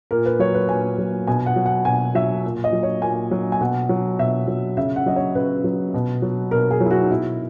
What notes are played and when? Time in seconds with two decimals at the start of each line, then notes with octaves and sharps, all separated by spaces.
0.11 A#2 A#4
0.26 B4
0.39 F#3 C#5
0.54 B4
0.69 A#2 G#5
0.98 F#3
1.27 B2 G#5
1.46 F#5
1.56 F#3
1.66 F#5
1.85 B2 G#5
2.15 F#3 E5
2.44 A#2
2.64 D#5
2.72 F#3
2.83 C#5
3.02 A#2 G#5
3.31 F#3
3.52 G#5
3.61 B2 F#5
3.89 F#3
4.19 B2 E5
4.47 F#3
4.77 C#3 E5
4.96 F#5
5.06 F#3 D#5
5.16 C#5
5.35 C#3 B4
5.64 F#3
5.94 B2
6.22 F#3
6.51 B2 A#4
6.71 G#4
6.80 F#3 E4
6.91 F#4
7.02 D#4
7.10 B2 E4